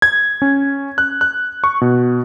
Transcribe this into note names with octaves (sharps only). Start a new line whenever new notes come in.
G#6
C#4
F#6
F#6
C#6
B2